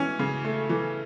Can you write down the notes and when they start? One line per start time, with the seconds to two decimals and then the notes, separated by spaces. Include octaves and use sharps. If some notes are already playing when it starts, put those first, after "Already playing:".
Already playing: E3 C#4
0.19 C#3
0.45 A3
0.69 E3